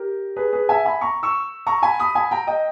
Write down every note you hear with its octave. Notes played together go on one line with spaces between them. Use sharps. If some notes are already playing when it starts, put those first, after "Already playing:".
Already playing: G4 A#4
G#4 B4
G#4 B4
E5 G#5
G#5 B5
A#5 C#6
C#6 E6
A#5 C#6
G#5 B5
B5 D#6
G#5 B5
G5 A#5
D#5 G5